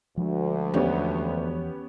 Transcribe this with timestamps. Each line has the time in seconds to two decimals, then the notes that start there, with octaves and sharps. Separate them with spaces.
0.17 D2 F3 G#3
0.74 E2 B3 C#4 G4